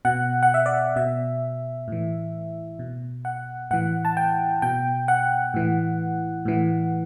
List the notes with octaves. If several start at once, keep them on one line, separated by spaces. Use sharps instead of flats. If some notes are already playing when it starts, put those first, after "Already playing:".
B2 F#5
F#5
E5
D5
B2 E5
A2 E3
B2
F#5
A2 E3 F#5
A5
G5
B2 G5
F#5
A2 E3
A2 E3